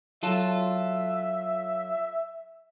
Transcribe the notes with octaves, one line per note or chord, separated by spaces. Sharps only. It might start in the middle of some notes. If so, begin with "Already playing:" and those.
F#3 F4 A4 E5